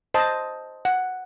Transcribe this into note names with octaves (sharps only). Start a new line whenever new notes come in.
C5 D#5 A5
F#5